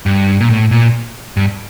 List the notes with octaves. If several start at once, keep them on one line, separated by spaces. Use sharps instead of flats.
G2
A#2
A2
A#2
G2